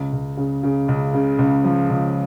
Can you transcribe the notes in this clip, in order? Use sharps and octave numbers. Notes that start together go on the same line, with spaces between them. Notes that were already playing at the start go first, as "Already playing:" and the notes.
Already playing: C#2
C#2
C#3
C#3
C#2
C#3
C#2
F3
C#2